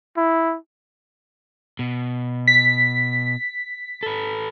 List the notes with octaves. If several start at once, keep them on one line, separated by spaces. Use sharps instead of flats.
E4
B2
B6
A4 B4